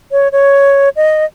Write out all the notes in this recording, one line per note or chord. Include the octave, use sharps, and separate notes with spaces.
C#5
C#5
D#5